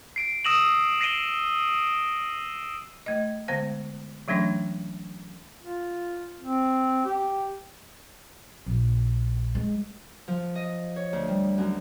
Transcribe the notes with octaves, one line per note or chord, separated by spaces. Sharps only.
C7 D7
D#6 E6 A#6 D#7 E7 F#7
A#6 C7 D7 D#7 G7
A3 D#5
D3 G#3 B3 C5 F5
E3 F#3 A3 C#4 D4
F4
C4
G4
A#1
G#3
F3
D#5
C#5
D2
G3
F#2